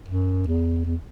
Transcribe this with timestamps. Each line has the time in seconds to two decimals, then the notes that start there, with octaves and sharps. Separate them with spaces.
0.08 F#2
0.46 E2
0.85 E2